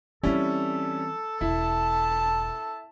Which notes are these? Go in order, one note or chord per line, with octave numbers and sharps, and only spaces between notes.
E3 G3 C4 C#4 E4 A4
E1 E4 A5